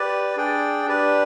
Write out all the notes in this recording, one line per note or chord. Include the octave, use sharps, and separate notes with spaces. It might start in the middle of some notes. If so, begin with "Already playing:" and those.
Already playing: G4 B4 D5
D4 G#4 D5 G5
D4 G4 B4 D5